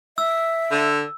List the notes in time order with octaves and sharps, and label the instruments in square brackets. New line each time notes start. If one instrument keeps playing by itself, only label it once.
[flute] E5 [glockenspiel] E6
[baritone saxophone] D3